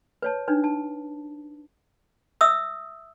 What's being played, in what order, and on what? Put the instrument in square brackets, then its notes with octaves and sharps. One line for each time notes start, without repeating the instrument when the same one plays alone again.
[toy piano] B4 C#5 A5
D4 D#4 B4
A5
E5 D#6 E6